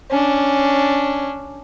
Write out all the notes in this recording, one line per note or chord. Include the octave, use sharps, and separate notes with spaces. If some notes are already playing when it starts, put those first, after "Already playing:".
C#4 D4